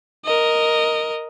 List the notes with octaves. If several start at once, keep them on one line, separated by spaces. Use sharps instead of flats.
A#4 D#5